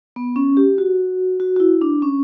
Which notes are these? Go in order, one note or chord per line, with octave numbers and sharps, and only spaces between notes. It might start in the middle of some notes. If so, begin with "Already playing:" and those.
B3
C#4
G4
F#4
F#4
F#4
E4
D4
C#4